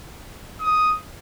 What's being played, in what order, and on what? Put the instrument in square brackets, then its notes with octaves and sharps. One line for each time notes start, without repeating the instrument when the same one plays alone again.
[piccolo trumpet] D#6